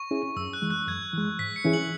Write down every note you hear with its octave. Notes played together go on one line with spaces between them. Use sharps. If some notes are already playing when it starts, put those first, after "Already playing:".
Already playing: C#6
C#4 E4 G#4
F#2 E6
F#6
E3 G#3
F#6
F#2 G#6
E3 G#3
G#2 B6
C#7
E3 C#4 E4 G#4
F#7